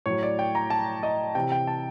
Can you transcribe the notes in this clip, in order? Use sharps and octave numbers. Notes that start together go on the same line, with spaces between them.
A2 F#3 C#5
D5
G5
A#5
A5
D#5
C3 E3 G5
G5
A5